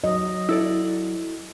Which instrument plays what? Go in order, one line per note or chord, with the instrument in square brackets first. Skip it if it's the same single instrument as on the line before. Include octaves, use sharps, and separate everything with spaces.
[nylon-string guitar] F#3 [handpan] D#5
[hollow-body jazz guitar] E4 A4 D5